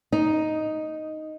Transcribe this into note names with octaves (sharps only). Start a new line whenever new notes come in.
D#4